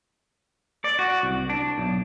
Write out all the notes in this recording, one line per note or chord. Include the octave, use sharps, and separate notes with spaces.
D5
F#4
C2
D4
B1